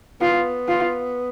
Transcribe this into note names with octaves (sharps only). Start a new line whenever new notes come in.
B3 F4
F4